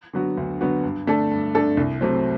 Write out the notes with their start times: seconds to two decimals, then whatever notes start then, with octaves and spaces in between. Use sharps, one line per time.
0.13 D3 F#3 B3 F#4
0.37 D2
0.61 D3 F#3 B3 F#4
0.83 G2
1.07 D3 A3 D4 A4
1.31 G2
1.55 D3 A3 D4 A4
1.77 C2
2.01 C3 F#3 A3 C4